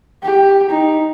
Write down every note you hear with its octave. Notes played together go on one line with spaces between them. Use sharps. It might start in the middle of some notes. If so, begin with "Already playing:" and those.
G4
D#4